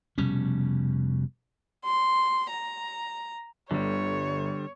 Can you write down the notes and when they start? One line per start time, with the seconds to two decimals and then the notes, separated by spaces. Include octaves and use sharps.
0.18 F1 B2 G3 C#4
1.85 C6
2.51 A#5
3.71 G1 D3 G3 C#5